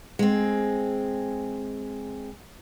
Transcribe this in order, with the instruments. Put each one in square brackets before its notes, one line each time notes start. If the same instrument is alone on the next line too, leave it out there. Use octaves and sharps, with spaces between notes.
[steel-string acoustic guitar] G#3 C4